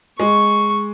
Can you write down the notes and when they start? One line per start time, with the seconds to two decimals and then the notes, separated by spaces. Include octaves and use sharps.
0.20 G#3 C#6